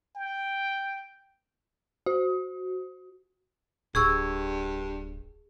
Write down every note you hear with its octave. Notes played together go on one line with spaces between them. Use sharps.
G5
F#4
D1 G2 G#4 C#6 E6